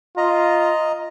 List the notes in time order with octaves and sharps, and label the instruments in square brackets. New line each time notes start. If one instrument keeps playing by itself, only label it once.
[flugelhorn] F4 [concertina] D#5 A#5